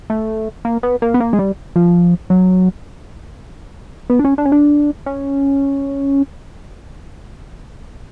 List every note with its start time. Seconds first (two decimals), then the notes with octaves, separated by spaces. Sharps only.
0.10 A3
0.65 A#3
0.83 B3
1.02 A#3
1.14 B3
1.20 A#3
1.33 G#3
1.39 G3
1.76 F3
2.30 F#3
4.10 B3
4.19 D4
4.24 C#4
4.38 D4
4.45 C#4
4.52 D4
5.06 C#4